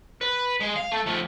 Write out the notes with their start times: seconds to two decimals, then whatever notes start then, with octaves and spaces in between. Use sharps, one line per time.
0.21 B4
0.60 G#3
0.76 F5
0.91 A3
1.06 F3 A3